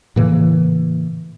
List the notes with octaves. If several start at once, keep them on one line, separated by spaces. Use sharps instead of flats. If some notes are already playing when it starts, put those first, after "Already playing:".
A2 C#3 E3 A#3